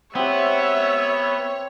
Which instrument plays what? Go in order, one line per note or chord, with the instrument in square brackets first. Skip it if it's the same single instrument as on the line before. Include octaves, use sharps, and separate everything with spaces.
[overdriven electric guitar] B3 [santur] C4 G4 [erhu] C#5 [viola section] E5